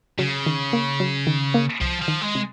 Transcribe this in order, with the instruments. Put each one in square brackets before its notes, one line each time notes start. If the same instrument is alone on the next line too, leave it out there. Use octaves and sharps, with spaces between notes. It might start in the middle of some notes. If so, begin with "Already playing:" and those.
[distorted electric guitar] C#3 [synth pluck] F#3
[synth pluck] D#3
A#3
F#3
D#3
A#3
[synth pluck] C2 [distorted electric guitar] F3
[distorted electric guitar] F3
[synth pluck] D#3
[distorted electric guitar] G#3
[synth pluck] C3